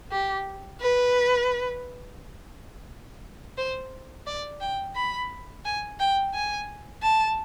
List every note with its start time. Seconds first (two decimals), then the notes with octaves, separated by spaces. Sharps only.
0.11 G4
0.81 B4
3.57 C5
4.27 D5
4.61 G5
4.96 B5
5.65 G#5
6.00 G5
6.35 G#5
7.03 A5